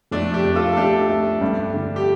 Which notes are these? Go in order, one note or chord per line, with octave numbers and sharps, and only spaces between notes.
F2 A3 D4
D4 G4
F2
F4 A4
A4
A3 D4 G4
A3
G2
D3
G4